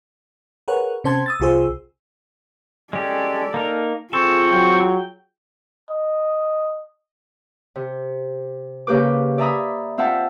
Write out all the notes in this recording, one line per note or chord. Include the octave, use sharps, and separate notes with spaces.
G#4 A#4 B4 C#5 F#5
C3 C#4 C5 A5 C6 G#6
D#6 E6 A6
C2 C3 F4 G#4 C5 E6
G#3 C#4 G4 A4 D5
A#3 D#4 A#4
C4 F4 G#4 A4 C#6
F#3 G5
D#5
C3
C#3 A#3 G4 B4 D6
D5 E5 G#5 A#5 B5 D#6
C4 F4 E5 F#5 G5 A5